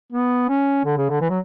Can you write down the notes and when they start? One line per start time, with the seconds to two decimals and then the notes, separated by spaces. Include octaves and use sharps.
0.12 B3
0.49 C#4
0.85 D3
0.97 C#3
1.09 D3
1.21 E3
1.30 F#3